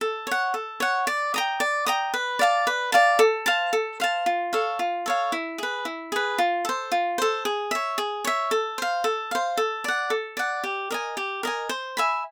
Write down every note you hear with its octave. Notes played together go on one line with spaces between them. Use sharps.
A4
C#5 F#5
A4
C#5 F#5
D5
G5 A#5 D#6
D5
G5 A#5 D#6
B4
D5 F5 A5
B4
D5 F5 A5
A4
C5 F5 A5
A4
C5 F5 A5
F4
A4 C#5 F5
F4
A4 C#5 F5
E4
G#4 B4
E4
G#4 B4
F4
A4 C5
F4
A4 C5
G#4
C#5 E5
G#4
C#5 E5
A4
C5 F5
A4
C5 F5
A4
D5 F#5
A4
D5 F#5
G4
A#4 D#5 G#5
G4
A#4 D#5 G#5
C5
E5 G#5 B5